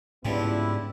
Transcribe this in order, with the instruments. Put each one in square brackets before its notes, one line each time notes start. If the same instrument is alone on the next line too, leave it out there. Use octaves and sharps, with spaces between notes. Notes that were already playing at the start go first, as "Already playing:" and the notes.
[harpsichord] C#2 F3 G3 [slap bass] G#2 [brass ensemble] B3 D4 E4